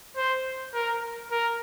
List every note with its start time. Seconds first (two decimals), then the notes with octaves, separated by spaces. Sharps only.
0.17 C5
0.74 A#4
1.31 A#4